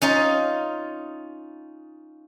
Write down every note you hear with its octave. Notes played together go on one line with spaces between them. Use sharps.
C#4 D#4 F4